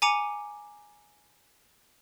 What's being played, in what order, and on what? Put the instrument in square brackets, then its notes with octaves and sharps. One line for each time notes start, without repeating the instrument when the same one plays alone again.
[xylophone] G#5 A#5 D6 C#7 D#7